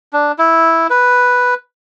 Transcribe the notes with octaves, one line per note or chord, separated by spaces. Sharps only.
D4
E4
B4